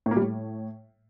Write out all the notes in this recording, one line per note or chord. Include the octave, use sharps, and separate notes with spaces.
A2
A#3
G3
A2